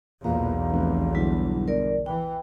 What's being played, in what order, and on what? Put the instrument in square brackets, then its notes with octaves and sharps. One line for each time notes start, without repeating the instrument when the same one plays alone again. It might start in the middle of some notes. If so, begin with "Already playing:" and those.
[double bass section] B1 E2 [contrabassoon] A#2 [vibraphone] F5 A#5
[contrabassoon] F1
[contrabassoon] G1 [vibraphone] F#3 E4
[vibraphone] A#4 D5
[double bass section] E3 [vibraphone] G5